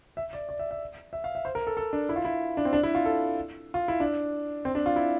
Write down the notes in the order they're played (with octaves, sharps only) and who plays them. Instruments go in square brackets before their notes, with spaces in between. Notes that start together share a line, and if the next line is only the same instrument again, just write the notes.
[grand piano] E5
D5
D5
E5
E5
E5
F5
E5
C5
A#4
A4
A4
D4
E4
F4
E4
D4
C4
D4
E4
F4
A4
F4
E4
D4
C4
D4
F4
E4